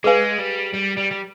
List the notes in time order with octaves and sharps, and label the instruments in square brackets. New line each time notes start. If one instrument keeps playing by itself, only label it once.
[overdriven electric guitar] G#3 [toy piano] G#4 B4 F5 G#5
[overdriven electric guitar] G3
G3
G3
G3